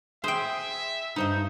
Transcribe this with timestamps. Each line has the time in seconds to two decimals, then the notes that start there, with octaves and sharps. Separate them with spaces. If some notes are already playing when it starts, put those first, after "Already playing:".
0.24 G#4 C5 E5 G5
1.16 G2 D#4 C5 D#5